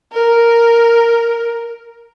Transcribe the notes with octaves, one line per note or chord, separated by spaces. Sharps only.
A#4